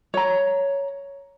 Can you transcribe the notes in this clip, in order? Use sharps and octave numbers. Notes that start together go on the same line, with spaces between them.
C#5 A#5